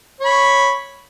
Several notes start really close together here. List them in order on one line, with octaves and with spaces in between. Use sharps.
C#5 B5 C#6